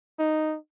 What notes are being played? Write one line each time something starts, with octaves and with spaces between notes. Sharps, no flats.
D#4